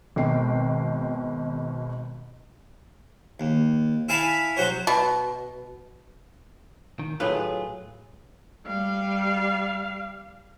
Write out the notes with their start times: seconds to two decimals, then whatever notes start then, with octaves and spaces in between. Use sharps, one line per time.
0.16 G#1 B2 G5 C7
3.40 D#2
4.09 E4 E5 F5 G#5 A5 B5
4.57 F#3 C4 F#4 C5 C#5
4.87 B2
6.99 D#3
7.20 A2 F#3 F4 G#4 B4
8.66 G3 F5